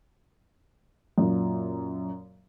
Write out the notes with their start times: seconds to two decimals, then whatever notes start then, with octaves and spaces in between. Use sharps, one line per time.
1.18 F#2 A#2